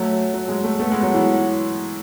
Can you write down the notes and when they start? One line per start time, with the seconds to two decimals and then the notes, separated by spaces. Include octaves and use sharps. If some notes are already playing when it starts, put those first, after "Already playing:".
Already playing: F#3 A3
0.34 F#3
0.49 G#3
0.64 A3
0.79 A3 B3
0.92 G#3
1.03 F#3
1.14 E3